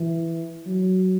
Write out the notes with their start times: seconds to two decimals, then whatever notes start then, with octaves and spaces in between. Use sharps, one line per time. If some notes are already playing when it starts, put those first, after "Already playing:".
Already playing: E3
0.67 F#3